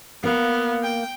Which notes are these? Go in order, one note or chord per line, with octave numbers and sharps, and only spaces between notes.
A#3 B3 A#4 F5
G5